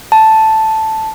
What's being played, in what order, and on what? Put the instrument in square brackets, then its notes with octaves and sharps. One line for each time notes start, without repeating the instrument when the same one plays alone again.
[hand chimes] A5